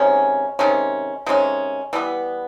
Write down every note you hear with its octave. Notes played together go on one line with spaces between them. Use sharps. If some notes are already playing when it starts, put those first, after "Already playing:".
Already playing: C3 D#3 G#3 C#4
C3 D#3 G#3 C#4
C3 D#3 G#3 C#4
E3 G3 B3